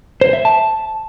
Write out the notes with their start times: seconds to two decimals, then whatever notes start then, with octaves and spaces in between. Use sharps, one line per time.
0.21 C5
0.33 E5
0.45 A5